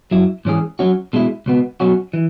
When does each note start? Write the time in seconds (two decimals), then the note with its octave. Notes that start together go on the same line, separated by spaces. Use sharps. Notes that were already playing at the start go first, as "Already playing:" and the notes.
0.11 F#2 F#3 E4
0.45 G#2 E3 C#4 G#4
0.79 F#3 C#4 F#4
1.13 B2 G#3 E4
1.46 C#2 B2 B3
1.80 B1 B2 F#3 C#4 F#4
2.13 E3